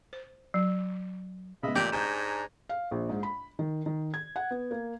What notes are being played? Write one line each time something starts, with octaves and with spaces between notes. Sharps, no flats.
C5
F#3
C#3 G#3 B3 D#5 E5 B5
A1 A#2 G4 A4
G#2 D4 G#5 A#5 G6 E7
F5
A#1
G#2
B5
D#3
D#3
G#6
F#5
B3
A#3